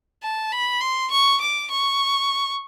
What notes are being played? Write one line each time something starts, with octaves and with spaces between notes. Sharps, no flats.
A5
B5
C6
C#6
D6
C#6